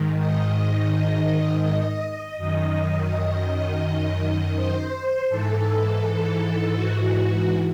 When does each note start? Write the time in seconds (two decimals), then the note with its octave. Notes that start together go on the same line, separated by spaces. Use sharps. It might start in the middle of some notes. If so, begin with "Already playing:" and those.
Already playing: G#2 D#3
0.17 D#5
0.90 D#5
2.37 F#2 D#3 D#5
4.56 C5
5.29 G#2 E3 A4
6.75 F#4